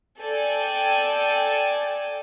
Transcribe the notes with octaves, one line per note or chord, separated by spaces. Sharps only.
A4 D5 G5 G#5